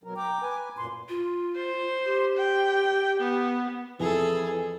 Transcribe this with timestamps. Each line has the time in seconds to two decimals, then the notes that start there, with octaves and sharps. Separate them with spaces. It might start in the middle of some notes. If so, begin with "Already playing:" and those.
0.04 B2 F#3 A#4
0.17 G5 A#5 D6
0.42 B4 G#5
0.77 F#2 A#2 C6
1.09 F4
1.56 C5
2.05 G4
2.37 G5
3.20 B3
4.00 F2 E3 G#4 A4 G#5